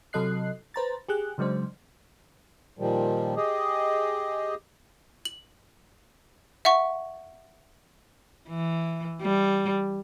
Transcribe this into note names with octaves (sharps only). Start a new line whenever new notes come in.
C3 F#3 A4 D#5 F#6 C7
B4 C5 A#5 A6
G4 G#4 F#6
C#3 F#3 G#3 D4 C5
A#2 D#3 F3 G3
G4 G#4 D#5
F#7
E5 F#5 C#6
E3
G3